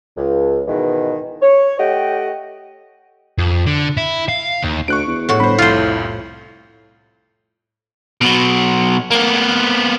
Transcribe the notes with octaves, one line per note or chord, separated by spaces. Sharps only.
C#2
G#2 B2 D#3 E3 G#3
C#5
A3 G4 D#5 F#5 G5
F2
D3
E4
F5
D#2
D2 C#6 F#6 D7
E2
A2 F#4
G1 C5 B5
C2 F2 A2 F4 C5
B2 F#3
A#3 B3